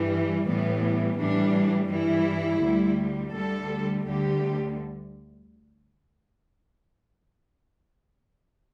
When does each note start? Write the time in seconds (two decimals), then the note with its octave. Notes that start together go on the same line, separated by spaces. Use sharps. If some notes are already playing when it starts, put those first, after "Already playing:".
Already playing: G2 E3 G3
0.47 A2 E3 G3 B3
1.18 A2 E3 G3 D4
1.90 G2 E3 G3 E4
2.62 D2 D3 G3
3.34 D2 D3 G3 A4
4.06 D2 D3 G3 G4